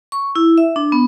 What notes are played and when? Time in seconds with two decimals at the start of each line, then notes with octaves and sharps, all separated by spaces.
0.12 C#6
0.35 E4
0.58 E5
0.76 D4
0.92 B3